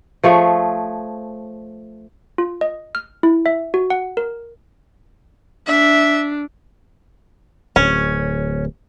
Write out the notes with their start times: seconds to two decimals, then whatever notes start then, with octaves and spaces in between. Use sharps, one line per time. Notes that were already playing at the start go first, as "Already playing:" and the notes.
0.23 F3 A3 G#4 C#5
2.38 F4
2.61 D#5
2.95 F6
3.23 E4
3.46 E5
3.74 F#4
3.90 F#5
4.17 A#4
5.67 D4 E5
7.76 D1 C#4